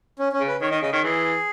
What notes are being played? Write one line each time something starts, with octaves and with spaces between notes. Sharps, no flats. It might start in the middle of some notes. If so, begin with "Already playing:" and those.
C#4
C#4
C#3
B4
D#3 C#5
D#3 D#5
C#3 D#5
D#3 C#5
E3 G#4